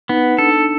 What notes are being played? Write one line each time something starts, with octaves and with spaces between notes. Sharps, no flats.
B3 D#4
D4 A4